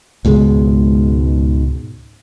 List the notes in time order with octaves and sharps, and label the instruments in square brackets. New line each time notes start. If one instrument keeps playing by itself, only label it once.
[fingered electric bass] C#2 G#2 B2 G#3